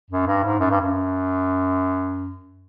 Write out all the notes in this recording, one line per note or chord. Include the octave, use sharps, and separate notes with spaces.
F#2
G2
G#2
F#2
G2
F#2